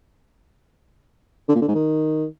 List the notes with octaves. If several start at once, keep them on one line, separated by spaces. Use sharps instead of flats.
D3
A#2
D3
G#2
D#3